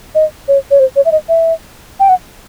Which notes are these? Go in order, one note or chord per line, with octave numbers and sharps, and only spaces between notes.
D#5
C#5
C#5
C5
C#5
E5
D#5
E5
G5
F#5